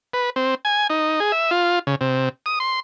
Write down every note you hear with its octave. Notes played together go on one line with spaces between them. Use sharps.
B4
C4
G#5
D#4
G#4
E5
F4
C#3
C3
D#6
C6